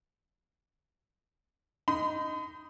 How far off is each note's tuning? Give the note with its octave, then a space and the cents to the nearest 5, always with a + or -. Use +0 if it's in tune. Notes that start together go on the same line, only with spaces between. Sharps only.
D#4 +0 B5 +45